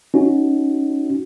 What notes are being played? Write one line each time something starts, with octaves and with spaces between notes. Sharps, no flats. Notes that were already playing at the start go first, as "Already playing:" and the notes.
C#4 D#4 F#4